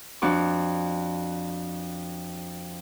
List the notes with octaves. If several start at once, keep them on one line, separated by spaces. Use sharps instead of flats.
F2 D4 F#4 D6